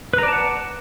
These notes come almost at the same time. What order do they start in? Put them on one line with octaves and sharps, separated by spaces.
B4 A#5 D5 A5 F#5